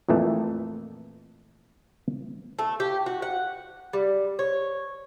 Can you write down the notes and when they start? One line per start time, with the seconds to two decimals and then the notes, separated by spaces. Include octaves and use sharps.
0.09 F2 A#2 E3 A3
2.59 A3
2.80 G4
3.06 F#4
3.22 F#5
3.93 G3
4.39 C#5